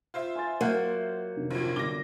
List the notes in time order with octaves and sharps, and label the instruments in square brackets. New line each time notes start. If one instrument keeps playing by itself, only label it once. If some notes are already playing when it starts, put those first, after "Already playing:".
[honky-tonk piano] F4 C5 E5
[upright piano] G#5 C6 A6
[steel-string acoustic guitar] F#3 A#3 [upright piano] F#5 F#6 G6
[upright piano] F1 D3
[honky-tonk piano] A#1 A#2
[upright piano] G1 G3 G7 [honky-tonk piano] D6 A#6